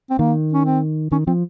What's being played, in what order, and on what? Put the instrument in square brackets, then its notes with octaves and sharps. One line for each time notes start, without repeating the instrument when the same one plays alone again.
[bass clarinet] C4
[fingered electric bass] D#3 [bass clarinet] A#3
[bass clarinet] C#4
C4
[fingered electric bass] D#3 [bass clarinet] C#4
[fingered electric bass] F3 [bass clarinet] C4